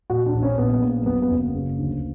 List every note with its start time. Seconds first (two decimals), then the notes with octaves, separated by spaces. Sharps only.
0.10 A#2 F#4
0.26 D4
0.34 A#1
0.43 C#4
0.58 A#2 B3
0.73 B3
0.82 A#1 A#3
1.02 A#3
1.06 F#2 B3
1.22 B3
1.30 F#1
1.39 A#3
1.54 C#3
1.78 D2